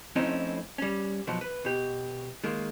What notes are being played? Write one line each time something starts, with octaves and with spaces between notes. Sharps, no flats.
F2 A2 C4 C#4 D#4 E4
G3 C#4
B2 F3 F#3
B4
B2 G4
D#3 G#3 A#3